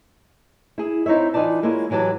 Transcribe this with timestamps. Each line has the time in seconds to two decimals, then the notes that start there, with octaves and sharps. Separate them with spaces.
0.78 E4 G#4
1.06 C4 D#4 E4 C#5 E5
1.34 E3 D#4 F4 D5 A5
1.63 G#3 A#3 C#4 E4 F4 A#4
1.90 G#2 E3 F#3 G4 A5